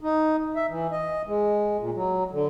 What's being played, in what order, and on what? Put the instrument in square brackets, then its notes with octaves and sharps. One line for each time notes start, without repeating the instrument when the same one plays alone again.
[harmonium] D#4
E5
E3
D#5
G#3
A#2
F#3
D3